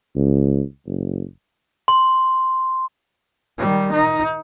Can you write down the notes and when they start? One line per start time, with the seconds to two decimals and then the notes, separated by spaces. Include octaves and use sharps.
0.16 C#2
0.86 F#1
1.88 C6
3.58 D#3 G3
3.93 D#4